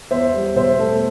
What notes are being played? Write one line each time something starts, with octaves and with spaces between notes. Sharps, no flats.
E2 C5 E5
G3
B2 C5 E5
A3